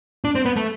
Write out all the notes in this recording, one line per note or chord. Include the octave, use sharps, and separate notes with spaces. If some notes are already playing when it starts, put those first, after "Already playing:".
D4
C4
B3
A3